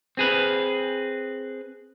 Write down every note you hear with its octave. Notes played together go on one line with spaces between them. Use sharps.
C4 G#4 B4